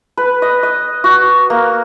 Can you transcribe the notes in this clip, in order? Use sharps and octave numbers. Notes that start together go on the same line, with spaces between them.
B4
D#5
D#5
F#4
A#3